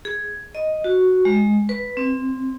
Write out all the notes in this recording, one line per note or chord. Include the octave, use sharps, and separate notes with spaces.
G#4
D#5
F#4
G#3
B4
C4